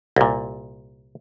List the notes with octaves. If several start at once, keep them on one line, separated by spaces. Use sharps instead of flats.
C2 A#2